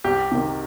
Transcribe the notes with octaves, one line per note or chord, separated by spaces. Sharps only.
C2 G4
C3 D#3